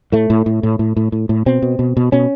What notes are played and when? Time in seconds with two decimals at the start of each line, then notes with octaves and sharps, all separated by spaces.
0.12 A2 A3
0.30 A2
0.46 A2
0.63 A2
0.79 A2
0.97 A2
1.12 A2
1.29 A2
1.46 B2 C4
1.62 B2
1.79 B2
1.97 B2
2.12 B2 C#4